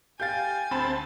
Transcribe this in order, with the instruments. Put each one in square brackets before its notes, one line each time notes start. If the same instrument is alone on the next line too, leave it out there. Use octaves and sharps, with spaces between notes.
[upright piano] G4 F5 [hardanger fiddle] G#5 [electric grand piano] G6 A6
[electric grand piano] D2 B5 E7 [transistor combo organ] C4 A5